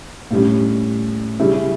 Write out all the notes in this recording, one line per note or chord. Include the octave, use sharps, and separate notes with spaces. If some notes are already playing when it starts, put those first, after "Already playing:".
A2 G3 C#4
C#3 G3 C#4 E4